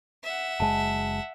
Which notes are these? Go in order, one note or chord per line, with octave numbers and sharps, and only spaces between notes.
E5 F#5
F#1 G#3 A5